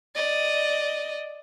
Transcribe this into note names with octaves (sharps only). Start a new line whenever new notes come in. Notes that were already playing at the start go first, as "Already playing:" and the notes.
D5 D#5